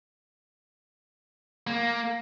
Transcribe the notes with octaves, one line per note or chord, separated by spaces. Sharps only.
A#3